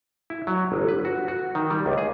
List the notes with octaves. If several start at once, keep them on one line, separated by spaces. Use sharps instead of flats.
E4
F#3
G1
B4
F#4
F#4
D#3
G3
C#2
G#4